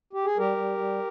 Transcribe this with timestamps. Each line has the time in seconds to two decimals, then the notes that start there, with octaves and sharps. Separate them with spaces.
0.13 G4
0.25 G#4
0.38 G3 G4 A#4
0.57 G3
0.77 G3